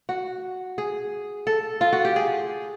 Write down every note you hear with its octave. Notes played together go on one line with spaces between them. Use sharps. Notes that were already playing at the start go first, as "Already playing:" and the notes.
F#4
G#4
A4
F4
F#4
G4
G#4